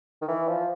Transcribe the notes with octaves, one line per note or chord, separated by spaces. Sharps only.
D#3
E3
F3